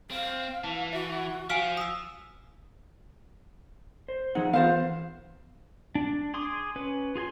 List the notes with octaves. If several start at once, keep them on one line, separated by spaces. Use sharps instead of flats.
C4 F5
E3 A5
F#4 E5
F3 F5 G#5 F6 B6 D7
D#6 E6
C5
F3 D#4 G#4 F#5
E3 B3 F4 C5 F5
D4
G#4 C6 D6 D#6
C#4 B4
F4 G#4 G#5 C6